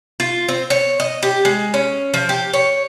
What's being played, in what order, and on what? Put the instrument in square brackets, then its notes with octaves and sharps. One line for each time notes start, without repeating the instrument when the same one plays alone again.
[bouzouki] F4
C4
C#5
D#5
G4
G#3
C#4
F3
G4
C#5